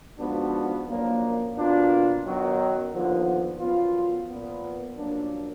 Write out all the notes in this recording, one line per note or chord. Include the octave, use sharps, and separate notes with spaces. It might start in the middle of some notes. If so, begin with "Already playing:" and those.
G#2 F3 B3 D4 F#4
F#2 F3 A#3 D4
B2 A#3 D4 F4
F#2 D#3 F#3 B3
D#2 D3 F3 B3
F#2 F3 B3 F4
A#2 F3 B3
F#2 F3 A#3 D4